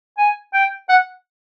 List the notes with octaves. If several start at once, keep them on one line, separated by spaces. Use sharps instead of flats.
G#5
G5
F#5